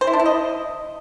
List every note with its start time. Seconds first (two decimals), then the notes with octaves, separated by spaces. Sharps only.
0.01 C5
0.07 E4
0.13 D4
0.20 E4
0.26 D#5